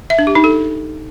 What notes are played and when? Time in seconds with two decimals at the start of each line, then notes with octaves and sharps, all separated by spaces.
0.10 E5
0.19 D4
0.27 G4
0.35 D#4
0.44 A4